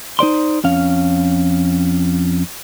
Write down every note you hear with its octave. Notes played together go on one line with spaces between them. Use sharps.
D#4 C5 D5 C6
F2 C#4 F5